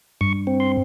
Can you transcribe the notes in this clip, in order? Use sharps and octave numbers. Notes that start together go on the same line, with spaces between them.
G2 C#6
C4
C6